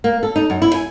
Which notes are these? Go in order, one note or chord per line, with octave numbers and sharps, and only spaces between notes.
A#3
A4
D#4
F#2
E4
G#5